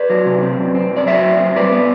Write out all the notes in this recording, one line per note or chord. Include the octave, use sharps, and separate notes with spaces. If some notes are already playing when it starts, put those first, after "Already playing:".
Already playing: B4 D5
F#3
C3
C4
F#2
C4
F#2
D5
F#3 C5 E5
F#2
C4
G2 B4 D5
B3